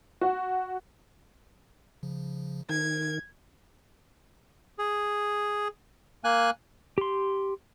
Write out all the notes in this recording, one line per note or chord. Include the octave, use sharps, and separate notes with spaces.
F#4
C#3 F3
D#3 A#4 G#6
G#4
A#3 G#5 F#6
G4 C6